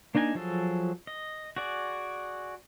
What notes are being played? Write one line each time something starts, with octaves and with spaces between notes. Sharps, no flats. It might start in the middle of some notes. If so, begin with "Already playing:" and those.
A#3 D4 D#4 D#5 G#5
F3 F#3 G#4 A4
D#5
F#4 G#4 D5